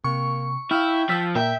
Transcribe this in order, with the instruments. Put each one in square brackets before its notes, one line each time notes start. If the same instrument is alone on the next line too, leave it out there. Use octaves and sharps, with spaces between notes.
[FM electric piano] C3 [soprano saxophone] A#3 [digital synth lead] C#6
[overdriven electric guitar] E4 [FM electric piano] F5 E6 F6 [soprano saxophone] G5
[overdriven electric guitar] F3 [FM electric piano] E6 A6 B6
[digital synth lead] A#2 [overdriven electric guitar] E5 [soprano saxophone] G5 [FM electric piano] A#5